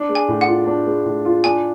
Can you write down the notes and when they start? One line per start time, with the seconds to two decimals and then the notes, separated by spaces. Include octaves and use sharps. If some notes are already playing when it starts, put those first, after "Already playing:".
Already playing: D4
0.09 G#3
0.15 G#5
0.28 A2
0.41 F#5
0.47 F4
0.67 D4
0.86 G#3
1.05 A2
1.25 F4
1.44 D4 G#5